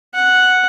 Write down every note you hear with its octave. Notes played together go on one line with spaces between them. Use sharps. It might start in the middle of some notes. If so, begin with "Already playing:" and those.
F#5